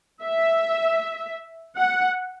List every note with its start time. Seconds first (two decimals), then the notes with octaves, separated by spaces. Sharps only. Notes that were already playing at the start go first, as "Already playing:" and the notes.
0.23 E5
1.77 F#5